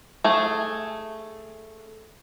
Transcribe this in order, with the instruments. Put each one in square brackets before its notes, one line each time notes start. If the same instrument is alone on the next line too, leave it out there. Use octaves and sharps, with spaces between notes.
[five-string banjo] A3 G#4